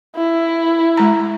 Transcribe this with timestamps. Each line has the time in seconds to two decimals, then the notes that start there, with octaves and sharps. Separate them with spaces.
0.16 E4
0.97 G#3 A#5